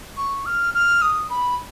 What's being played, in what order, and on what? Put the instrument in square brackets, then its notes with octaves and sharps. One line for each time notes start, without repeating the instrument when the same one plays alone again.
[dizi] C#6
F6
F6
D#6
B5